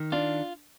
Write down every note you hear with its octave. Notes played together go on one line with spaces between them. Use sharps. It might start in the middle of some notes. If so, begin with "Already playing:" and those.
Already playing: D#3
D4 F4